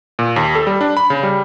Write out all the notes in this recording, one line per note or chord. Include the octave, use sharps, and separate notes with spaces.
A#2
D#2
A4
G3
D4
B5
C#3
G3